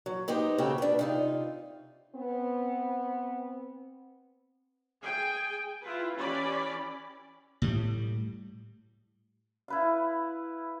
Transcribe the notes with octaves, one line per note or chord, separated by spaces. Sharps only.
F#3
B3 D#4 G4 C5
C#3 C4 F#4 G4 A4
D4 B4
C3 D#4 F4
B3 C4
G#4 G5 G#5
E4 F4 B4
E3 C#4 G4 D5 B5
A2 G3
E4 B4 F5